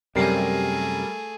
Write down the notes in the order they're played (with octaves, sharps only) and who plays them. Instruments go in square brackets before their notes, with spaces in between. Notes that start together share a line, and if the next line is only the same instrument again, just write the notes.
[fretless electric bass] F#2 C3 [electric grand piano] G3 A#4 C7 [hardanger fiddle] A3 G#4